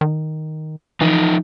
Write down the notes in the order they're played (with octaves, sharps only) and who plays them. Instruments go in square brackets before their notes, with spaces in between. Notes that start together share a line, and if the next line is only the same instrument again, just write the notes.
[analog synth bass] D#3
[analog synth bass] E3 [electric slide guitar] F3 D#4